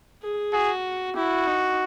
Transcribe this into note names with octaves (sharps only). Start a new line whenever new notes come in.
G#4
F#4 G#4
E4 F#4
D#4